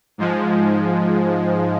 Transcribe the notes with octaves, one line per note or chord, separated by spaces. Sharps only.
G#2 F3 G#3